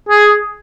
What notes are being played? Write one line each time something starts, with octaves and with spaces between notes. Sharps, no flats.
G#4